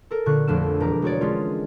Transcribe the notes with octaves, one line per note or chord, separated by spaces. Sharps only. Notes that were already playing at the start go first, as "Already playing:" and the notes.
A4 A#4
A#2 D3 C#6 F#6
A#1 F2 A3 D4 F6 E7
E1 A#4 A#5 D6
G#3 F#4 C#5 D5
G#3 C#4 D4 F4